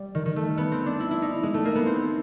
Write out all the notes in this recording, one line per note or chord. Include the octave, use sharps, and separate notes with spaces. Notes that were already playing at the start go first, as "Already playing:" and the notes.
Already playing: G3
D#3
D#3
A3
B3
C4
D4
E4
E4
D#4
G#3
A3
A#3
B3
C4